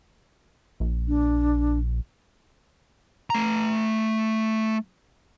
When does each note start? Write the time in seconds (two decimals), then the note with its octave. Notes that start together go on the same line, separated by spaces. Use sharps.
0.80 A#1
1.08 D4
3.30 A3 A#5